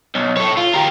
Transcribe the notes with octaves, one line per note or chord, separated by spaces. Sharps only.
B1
A4 C#5
F4
G4 A#4